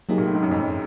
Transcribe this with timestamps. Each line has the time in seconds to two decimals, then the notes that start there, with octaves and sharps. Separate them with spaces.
0.09 C3 F#3 A#3 D#4 G#4
0.18 A#2
0.26 A2
0.35 G#2
0.43 F#2
0.51 F2
0.60 F#2